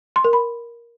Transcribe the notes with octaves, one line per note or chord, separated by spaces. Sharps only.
C6
A#4
B5